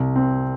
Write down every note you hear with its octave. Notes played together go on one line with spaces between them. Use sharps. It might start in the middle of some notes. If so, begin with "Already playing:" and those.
Already playing: C2
C4